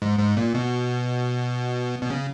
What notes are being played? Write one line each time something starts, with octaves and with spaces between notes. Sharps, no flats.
G#2
G#2
A#2
B2
B2
C#3